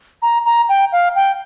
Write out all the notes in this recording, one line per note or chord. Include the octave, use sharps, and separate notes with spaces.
A#5
A#5
G5
F5
G5